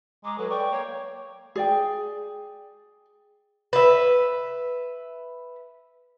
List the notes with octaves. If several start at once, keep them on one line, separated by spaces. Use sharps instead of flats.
G#3 A#5 D6
F#3 A4 B4
D5 G5 C#6
A#3 C#5
G#4 D5 G5
B4 E5